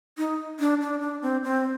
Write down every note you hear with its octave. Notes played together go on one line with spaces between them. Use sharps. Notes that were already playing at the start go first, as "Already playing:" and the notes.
D#4
D4
D4
D4
C4
C4